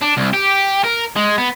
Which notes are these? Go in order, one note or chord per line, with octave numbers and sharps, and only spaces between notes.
D4
C2
G4
A#4
G#3
B3